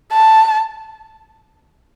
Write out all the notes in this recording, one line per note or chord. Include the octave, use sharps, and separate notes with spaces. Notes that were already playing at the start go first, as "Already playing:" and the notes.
A5